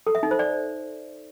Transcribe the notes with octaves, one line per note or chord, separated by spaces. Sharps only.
A4
E5
D#4
C5
D5